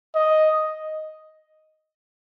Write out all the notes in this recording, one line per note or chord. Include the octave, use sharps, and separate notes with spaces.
D#5